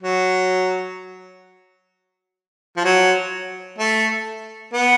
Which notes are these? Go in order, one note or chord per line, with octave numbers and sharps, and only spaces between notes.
F#3
F3
F#3
A3
B3